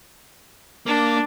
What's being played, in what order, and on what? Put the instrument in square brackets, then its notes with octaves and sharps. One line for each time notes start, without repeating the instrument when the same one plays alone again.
[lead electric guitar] A#3 [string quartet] D4